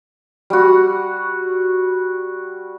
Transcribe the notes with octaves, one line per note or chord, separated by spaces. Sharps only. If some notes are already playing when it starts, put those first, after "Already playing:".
G3 F#4